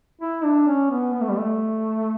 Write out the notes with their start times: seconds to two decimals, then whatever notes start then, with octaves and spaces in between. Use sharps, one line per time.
0.21 E4
0.44 D4
0.67 C#4
0.90 B3
1.14 B3
1.21 A3
1.29 G3
1.38 A3